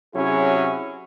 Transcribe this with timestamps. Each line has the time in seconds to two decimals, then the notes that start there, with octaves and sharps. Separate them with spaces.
0.16 C3 F#3 C#4 E4 F#4 G#4